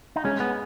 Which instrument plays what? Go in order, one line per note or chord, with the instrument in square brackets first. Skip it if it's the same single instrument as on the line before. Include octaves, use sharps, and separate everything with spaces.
[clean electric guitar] D#4
[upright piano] G#3 [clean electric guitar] C#4
[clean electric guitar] B3